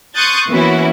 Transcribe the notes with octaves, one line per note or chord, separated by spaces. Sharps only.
C6 C#6 D#6 F#6 G6 A6
E3 A#3 B3 C#4 E4 F#4